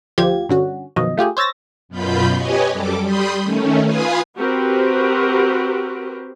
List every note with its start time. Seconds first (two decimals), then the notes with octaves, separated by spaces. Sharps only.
0.18 D2 F3 F4 G4 G#6
0.49 G2 D3 C#4 F#4
0.96 F#2 B2 D#3 F3 D#5
1.17 A3 F4 G4 G#4
1.37 C5 C#5 E6 A6 A#6
1.89 F#2 B2 F4 B5 G6
2.35 G4 B4 C#5 D#5 G#5
2.72 F#2 G3 A4 D6
3.02 G3 B5 C6 D#6 G6
3.43 D#3 A3 C#4
3.84 F4 B4 F5 G#5 D#6
4.37 C4 F#4 G4 A#4 B4